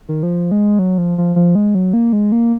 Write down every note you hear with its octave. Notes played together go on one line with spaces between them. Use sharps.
D#3
F3
G#3
F#3
F3
F3
F3
G#3
F#3
A#3
G#3
A#3